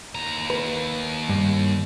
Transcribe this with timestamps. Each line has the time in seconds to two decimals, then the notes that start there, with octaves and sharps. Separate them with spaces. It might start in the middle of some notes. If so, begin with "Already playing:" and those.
0.15 D#2 A#5
0.50 B4
1.29 G2